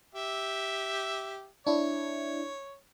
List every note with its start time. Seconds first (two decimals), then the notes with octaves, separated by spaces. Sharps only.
0.15 G4 E5
1.67 D4 E4 C#5